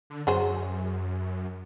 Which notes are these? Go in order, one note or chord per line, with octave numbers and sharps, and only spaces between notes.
D3
F#2 F#3 G#4 C5